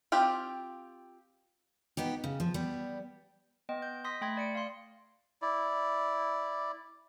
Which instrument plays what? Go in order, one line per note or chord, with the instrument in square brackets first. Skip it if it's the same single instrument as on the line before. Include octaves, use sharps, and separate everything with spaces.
[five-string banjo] C4 F4 G4
[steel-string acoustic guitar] B3 D#4 G4
C#3
F3
G3 B3
[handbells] B3 D#5 G5
G6
C6 D#6 A#6 B6
A3 G5 B5 C6 G#6
D5 C#7 D7
F5 C6
[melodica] E4 D5